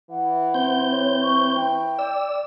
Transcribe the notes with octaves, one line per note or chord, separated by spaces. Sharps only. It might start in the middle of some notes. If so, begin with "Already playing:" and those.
E3 F#5
C4 G6
C#5
C#6
G5
D5 E6